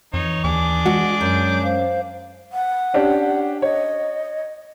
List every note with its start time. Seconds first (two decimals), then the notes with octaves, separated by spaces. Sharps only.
0.14 F2 E3 D#4 C#5
0.44 D#2 D4 G#4 D6
0.86 G#3 F#4
1.21 F#2 F#3 G6
1.64 C5 F5
2.53 F#5
2.94 C#4 D4 G4
3.62 C#5 D#5